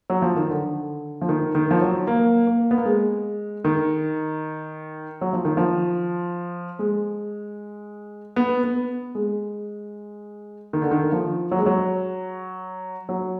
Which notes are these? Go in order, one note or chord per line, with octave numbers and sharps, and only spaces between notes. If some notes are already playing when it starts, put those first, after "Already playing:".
F#3
F3
D#3
D3
F3
D#3
D#3
F3
F#3
A#3
A#3
B3
A#3
G#3
D#3
F#3
F3
D#3
F3
G#3
B3
B3
G#3
D#3
D3
D#3
F3
F#3
G#3
F#3
F#3